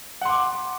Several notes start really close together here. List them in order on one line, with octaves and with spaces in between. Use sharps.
F#5 C6 D6